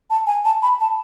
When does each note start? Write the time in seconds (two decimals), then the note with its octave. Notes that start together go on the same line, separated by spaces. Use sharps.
0.10 A5
0.27 G#5
0.45 A5
0.62 B5
0.80 A5